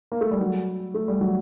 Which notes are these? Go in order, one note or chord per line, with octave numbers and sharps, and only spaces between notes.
A#3
A3
G3
F#3
A3
G3
F#3